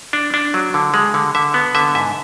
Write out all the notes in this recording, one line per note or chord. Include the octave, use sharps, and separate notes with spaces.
D4
D4
F#3
D3
G#3
D3
D3 E5
B3
D3 E5
G#2 E5